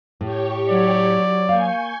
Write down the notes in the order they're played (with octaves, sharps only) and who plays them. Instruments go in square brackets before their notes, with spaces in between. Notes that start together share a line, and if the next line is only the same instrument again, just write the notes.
[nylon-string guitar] A2 [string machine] G4 C#5
[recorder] F#3 [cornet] D5
[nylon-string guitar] A#3 F5 [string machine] G#5 C#6 G6